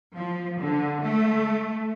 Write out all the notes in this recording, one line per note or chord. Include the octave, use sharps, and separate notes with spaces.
F3
D3
A3